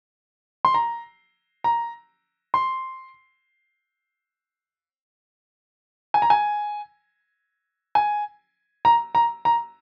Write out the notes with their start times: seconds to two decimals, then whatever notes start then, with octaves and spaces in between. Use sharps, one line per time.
0.65 C6
0.74 A#5
1.64 A#5
2.54 C6
6.14 G#5
6.22 A#5
6.30 G#5
7.95 G#5
8.85 A#5
9.15 A#5
9.45 A#5